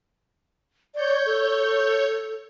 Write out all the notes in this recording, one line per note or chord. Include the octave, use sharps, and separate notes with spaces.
C#5 D5 G6
A4